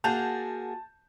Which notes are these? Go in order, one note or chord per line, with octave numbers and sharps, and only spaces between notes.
A#3 F#4 G#4 A5 G6 F7